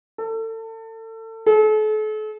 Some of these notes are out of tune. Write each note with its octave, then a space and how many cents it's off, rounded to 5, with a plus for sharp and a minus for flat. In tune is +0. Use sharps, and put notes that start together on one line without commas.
A4 +30
A4 -40